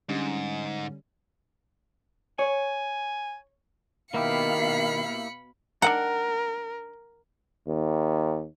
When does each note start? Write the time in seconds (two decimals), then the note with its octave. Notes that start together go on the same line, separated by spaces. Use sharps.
0.09 G#2 D3 G3 C#4
2.39 C#5 G#5
4.14 B2 D#3 A#3 E4 G4 F5 B5 C#7
5.82 D4 A#4 F#5 G5 A#5
7.68 D#2